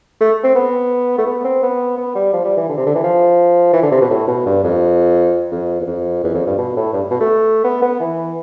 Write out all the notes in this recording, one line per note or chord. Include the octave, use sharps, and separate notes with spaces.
A3
C4
B3
A3
B3
C4
B3
B3
G3
F3
G3
E3
D3
C3
D3
E3
F3
E3
D3
C3
B2
A2
B2
G2
F2
F2
E2
F2
E2
F2
G2
B2
A2
G2
B2
A3
B3
B3
E3